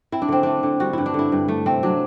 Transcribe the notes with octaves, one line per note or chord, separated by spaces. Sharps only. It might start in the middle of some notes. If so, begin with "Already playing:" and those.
C4 E4
D4
D3 C4
A3 D4
D3
G3 F#4
G2 E4
D4
D3 E4
G2
A3
C3 C4
F#3 D4